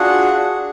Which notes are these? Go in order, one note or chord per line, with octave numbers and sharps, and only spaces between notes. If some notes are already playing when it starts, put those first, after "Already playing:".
Already playing: D4 F4 F#4 G#4 F#5
D4 G#4